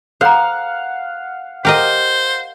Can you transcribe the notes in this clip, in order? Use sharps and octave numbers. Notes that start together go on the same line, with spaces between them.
A4 C5 F5 F#5 A#5
G4 A#4 C5 D#5